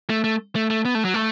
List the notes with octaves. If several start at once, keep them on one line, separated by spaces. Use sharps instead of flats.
A3
A3
A3
A3
B3
A3
F#3
A3